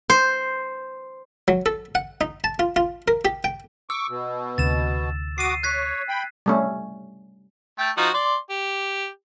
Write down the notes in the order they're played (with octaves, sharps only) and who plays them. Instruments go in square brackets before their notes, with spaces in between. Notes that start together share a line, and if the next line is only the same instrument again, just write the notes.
[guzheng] C5
[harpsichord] F#3
A4
F#5
D#4
A5
F4
F4
A#4
G4
G5
[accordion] C#6 D6 [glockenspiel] E6
[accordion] B2
[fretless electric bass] D2 C3 [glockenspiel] A6 E7
[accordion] F#4 D6 D#6 [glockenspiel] C7 D#7
[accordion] C#5 [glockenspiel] F#6 G#6 B6
[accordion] G5 B5
[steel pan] G3 A3 C#4
[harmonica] A3 G5
F3 D#4 F#4
D5 C6
G4